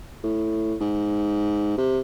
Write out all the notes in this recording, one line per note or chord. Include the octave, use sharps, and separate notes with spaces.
A2
G#2
C3